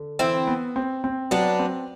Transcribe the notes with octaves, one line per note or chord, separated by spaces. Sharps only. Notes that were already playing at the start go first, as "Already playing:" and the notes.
Already playing: D3
E3 C4 E4
B3
C4
C4
F#3 B3 D4
C4